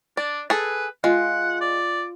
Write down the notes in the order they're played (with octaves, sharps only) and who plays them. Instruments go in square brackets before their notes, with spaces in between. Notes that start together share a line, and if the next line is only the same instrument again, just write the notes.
[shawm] D4 [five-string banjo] D5
[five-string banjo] G#4 A4 [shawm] B4
[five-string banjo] G#3 [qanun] F4 [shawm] F#5
[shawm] D5